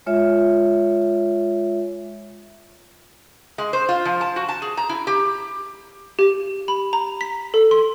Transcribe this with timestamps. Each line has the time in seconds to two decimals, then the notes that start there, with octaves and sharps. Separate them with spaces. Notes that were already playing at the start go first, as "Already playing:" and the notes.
0.06 G#3 F4 C#5 E5
3.58 G#3
3.73 C5
3.89 F4
4.05 F3
4.21 A5
4.36 F#4
4.49 A5
4.62 G#4
4.77 A#5
4.89 E4
5.07 G4
6.19 G4
6.68 B5
6.93 A#5
7.21 B6
7.54 A4
7.71 C6